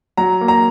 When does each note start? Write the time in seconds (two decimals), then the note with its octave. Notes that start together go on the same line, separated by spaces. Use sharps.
0.17 F#3 A#5
0.41 A#3
0.48 A#5